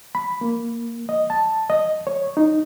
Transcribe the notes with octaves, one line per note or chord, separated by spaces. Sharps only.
B5
A#3
D#5
A5
D#5
C#5
D#4